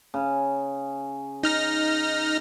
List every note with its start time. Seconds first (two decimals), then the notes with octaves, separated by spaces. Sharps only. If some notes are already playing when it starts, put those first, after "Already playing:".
0.14 C#3
1.43 D#4 F6 A#6